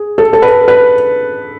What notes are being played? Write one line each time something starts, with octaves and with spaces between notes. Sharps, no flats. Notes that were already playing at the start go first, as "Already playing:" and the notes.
Already playing: G#4
A4
A4
B4
B4